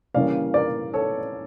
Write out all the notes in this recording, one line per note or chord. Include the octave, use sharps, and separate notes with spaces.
C#3 E3 G3 A#3 C#4 D5 F5
A#4 D5
A4 C#5